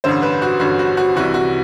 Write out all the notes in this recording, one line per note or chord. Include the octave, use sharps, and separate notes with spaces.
A1 G2 D3 C5
B4
F#4
A1 G2 D3 F#4
F#4
F#4
C2 C3 E3 F#4
F#4